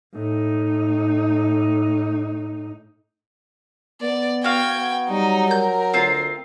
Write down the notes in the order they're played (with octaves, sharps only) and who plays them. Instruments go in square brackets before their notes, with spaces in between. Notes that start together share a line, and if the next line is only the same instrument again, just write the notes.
[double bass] A2 D#4
[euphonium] B3 [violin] D5
[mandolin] F#4 F5 [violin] G5 G#6
[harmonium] B3
[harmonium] F#3 [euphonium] G3 [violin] D#4
[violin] A#4 [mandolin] G6
[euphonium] D2 [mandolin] C4 F4